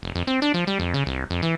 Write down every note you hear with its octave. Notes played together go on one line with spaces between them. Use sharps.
F1
F2
C4
D4
F3
G3
F2
C#3
C2
F2
E3